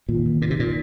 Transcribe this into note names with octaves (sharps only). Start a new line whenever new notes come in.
A#2 D#3
D#3
A#2 D#4
C3
A#2 D#3